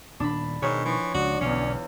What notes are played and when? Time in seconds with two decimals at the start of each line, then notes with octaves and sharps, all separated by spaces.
0.20 D#1 D4 B5
0.62 G#2 B2 D#3 C#5
0.85 E3 F3 C#6
1.14 C#2 D4 F#4
1.41 B1 E2 D3 C#4 F5